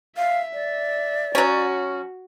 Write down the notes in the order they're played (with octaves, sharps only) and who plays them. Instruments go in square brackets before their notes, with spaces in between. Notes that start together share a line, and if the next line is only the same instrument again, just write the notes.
[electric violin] E5 [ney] F5
[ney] D5
[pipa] F#3 C#4 [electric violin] F#4